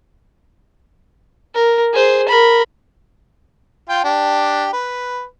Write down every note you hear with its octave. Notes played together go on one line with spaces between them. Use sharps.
A#4
G#4 C5
A#4 B5
F4 G5
D4 G4
B4